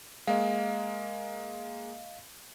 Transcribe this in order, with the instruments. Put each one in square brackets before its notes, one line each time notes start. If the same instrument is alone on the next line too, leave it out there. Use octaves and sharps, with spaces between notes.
[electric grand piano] G#3 A#3 [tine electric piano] D#5 F5